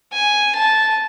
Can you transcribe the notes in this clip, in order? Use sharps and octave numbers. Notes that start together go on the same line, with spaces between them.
G#5
A5